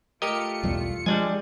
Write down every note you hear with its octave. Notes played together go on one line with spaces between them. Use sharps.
A3 F4 G4 A#4 D#5 C#7
B1 E2 G3
F3 G3 G#3 D4 G#5